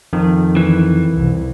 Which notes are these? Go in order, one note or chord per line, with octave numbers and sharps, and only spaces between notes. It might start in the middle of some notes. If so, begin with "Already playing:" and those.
F2 D#3
E3
C2